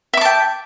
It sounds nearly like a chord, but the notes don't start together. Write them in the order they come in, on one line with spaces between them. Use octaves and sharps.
E5 D6 A5 G5